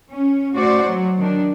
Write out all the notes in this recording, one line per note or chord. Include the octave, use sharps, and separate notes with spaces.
C#4
A3 F#4 C5 D5
F#3
D#3 D4